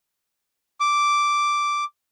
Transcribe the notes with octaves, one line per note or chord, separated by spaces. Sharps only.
D6